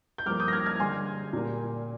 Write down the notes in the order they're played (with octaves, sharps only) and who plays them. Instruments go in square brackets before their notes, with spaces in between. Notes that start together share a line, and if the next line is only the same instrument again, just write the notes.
[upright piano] G6
G2 F3 A#3 D6 F6
D#6 G6
A#6
F6 G#6
F6 G#6
G2 D3 G#3 G#5 C6
A#2 G3 A#3